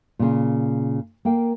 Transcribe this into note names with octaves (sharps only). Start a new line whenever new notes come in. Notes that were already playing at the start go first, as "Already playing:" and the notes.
A#2 C#3
A#3 A#4 F5 G5